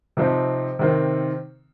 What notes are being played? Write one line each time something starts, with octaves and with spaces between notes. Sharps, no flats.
C3 F3 C4 D#4
C3 D#3 C4